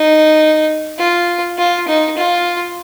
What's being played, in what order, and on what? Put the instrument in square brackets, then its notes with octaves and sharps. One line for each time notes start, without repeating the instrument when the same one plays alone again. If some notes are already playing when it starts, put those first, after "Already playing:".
Already playing: [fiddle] D#4
F4
F4
D#4
F4